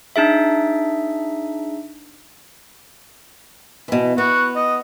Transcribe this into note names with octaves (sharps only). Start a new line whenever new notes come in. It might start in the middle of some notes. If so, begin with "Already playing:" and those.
D4 D#4 G#4 E5
B2 E3
B3 F#4
D#5